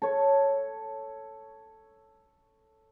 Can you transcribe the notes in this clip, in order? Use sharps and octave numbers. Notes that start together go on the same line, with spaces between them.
A4 C#5